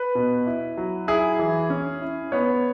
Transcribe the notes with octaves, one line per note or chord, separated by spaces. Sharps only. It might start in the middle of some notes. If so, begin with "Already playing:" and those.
Already playing: B4
B2
E4
F#3
E4 G#4
E3
C#4
E4
B3 C#5